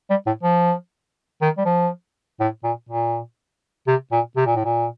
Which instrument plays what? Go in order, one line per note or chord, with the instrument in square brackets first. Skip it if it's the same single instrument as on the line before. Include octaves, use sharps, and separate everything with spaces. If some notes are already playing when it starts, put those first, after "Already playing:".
[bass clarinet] G3
A2
F3
D#3
G3
F3
A2
A#2
A#2
C3
A#2
C3
A#2
A2
A#2